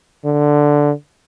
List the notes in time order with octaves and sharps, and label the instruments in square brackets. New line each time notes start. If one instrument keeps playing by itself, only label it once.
[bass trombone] D3